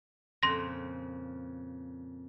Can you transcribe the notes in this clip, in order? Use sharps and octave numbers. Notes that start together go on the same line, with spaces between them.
F2 A#2 C#3 C6 A#6